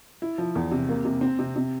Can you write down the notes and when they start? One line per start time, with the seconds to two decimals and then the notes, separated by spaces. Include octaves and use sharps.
0.22 E4
0.38 F3
0.55 E2
0.71 C3
0.89 A#3
1.05 C3
1.21 C4
1.39 C3
1.56 C3